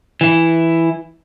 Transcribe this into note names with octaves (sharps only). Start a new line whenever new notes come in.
E3 E4